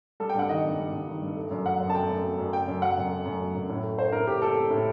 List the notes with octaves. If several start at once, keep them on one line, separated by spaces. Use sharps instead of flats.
G3 A4
G5
G2 F#5
D#3 D#5
G2
G3
G2
D#3
G2
A3
F#2
F#3 F#5
F#2
A5
A3 G5
F#2
F#3
F#2
A3 G5
F#2
F#3 F#5
F#2
A3
F#2
F#3
F#2
A2
A3
A3 C5
A2 A#4
A2 G4
A3 A4
A3
A2